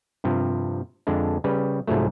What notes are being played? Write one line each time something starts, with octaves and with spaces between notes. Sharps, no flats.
G2 C3 F3
F2 D3 G#3 D4
C#3 G3 B4
C2 G#2 F3 F#3 A3